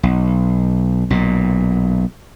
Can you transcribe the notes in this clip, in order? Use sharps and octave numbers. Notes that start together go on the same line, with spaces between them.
B1
B1 A#2